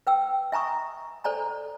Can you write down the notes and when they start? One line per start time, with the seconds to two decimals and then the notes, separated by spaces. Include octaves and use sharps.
0.07 B4 G5 E6
0.52 E5 G#5 A#5 C#6 D#6
1.24 A4 C5 D5 G#5 A#5